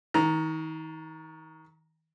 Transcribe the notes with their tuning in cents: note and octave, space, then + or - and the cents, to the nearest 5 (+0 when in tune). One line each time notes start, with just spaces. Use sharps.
D#3 +40 A#5 +0